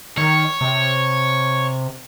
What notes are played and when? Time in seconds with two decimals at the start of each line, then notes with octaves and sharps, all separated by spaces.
0.18 D#3 C#5
0.61 C3